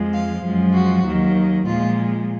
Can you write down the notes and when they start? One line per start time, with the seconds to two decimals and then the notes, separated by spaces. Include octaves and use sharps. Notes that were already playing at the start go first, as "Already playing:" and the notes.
Already playing: F2 F3 G#3
0.13 F5
0.44 F#2 F3 G#3
0.74 F#4
1.04 D#2 D#3 F#3
1.66 A#2 F3 G#3 F4